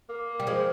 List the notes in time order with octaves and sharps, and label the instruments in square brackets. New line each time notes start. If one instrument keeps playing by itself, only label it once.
[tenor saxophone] A#3
[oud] G3
F3 G#3